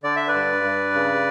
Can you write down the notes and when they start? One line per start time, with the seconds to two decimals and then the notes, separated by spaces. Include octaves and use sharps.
0.03 D3 D5
0.16 E5
0.28 B4 D5
0.34 G2
0.64 G2
0.94 C#3